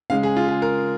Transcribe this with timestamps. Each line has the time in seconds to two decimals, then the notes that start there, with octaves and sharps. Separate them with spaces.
0.10 C#3 G#3 C#4 F5
0.23 G#4
0.36 F4
0.48 G#4
0.62 A#4